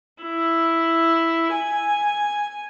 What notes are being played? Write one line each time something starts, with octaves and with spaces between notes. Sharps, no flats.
E4
G#5